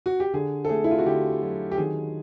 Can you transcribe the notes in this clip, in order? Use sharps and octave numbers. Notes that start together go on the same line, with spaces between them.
F#4
G4
D3 G#4
A4
A3 G#4
E4
F4
F#4
D3 G4
F#3
G4
D#3 G#4